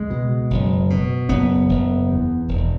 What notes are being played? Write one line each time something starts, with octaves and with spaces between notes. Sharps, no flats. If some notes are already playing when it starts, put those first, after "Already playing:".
Already playing: C#2 G#3
B2
F#1
B2
F#1 B3
F#1
E2
E1